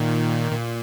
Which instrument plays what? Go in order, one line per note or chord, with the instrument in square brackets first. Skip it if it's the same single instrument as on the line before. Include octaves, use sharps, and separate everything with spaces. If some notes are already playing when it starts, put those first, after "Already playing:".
Already playing: [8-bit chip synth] A#2 D#3
A#2